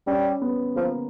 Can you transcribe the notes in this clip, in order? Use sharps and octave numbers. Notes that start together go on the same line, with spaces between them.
G3 C#4
B3
F3 A#3